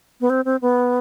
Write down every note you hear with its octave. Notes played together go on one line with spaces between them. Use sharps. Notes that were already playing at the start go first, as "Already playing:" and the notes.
B3
C4
C4
B3